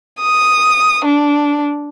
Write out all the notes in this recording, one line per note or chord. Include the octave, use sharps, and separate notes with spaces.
D#6
D4